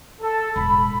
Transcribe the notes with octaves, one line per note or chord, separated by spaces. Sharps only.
A4
E1 A1 B5